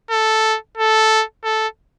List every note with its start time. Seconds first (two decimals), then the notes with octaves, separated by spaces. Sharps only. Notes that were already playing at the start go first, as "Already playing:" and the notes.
0.11 A4
0.77 A4
1.44 A4